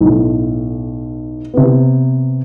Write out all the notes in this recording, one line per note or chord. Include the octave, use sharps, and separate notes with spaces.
B1 A2
C3 B3